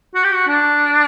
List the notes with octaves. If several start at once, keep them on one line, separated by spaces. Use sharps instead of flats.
F#4
G4
F#4
D4